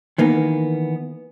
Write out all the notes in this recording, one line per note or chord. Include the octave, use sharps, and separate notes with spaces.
D#3 E3 A#3 B3